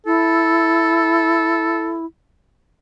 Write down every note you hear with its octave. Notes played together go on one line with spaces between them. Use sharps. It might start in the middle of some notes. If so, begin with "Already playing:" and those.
E4 A4